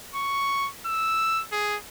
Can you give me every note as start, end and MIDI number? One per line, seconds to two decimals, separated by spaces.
0.14 0.69 85
0.86 1.43 88
1.52 1.77 68